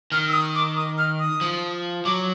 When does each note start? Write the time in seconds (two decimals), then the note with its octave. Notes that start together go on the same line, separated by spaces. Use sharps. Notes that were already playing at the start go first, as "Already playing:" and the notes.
0.12 D#3 F6
0.28 E6
0.33 D#6
0.55 D6
0.76 D#6
0.98 F6
1.20 D#6
1.41 F3
2.05 F#3 D6